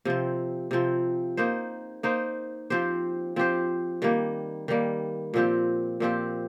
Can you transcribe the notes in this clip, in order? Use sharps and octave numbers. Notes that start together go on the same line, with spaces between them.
C3 F3 C4
C3 F3 C4
A#3 D#4 C5
A#3 D#4 C5
F3 C4 G4 C5
F3 C4 G4 C5
D#3 G3 A#3
D#3 G3 A#3
A#2 F3 C4 G4
A#2 F3 C4 G4